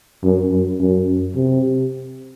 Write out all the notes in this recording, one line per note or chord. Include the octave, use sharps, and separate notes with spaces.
F#2
F#2
F#2
C3